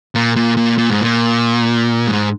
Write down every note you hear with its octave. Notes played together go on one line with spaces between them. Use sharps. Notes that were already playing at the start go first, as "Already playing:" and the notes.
A#2
A#2
A#2
A#2
G#2
A#2
G#2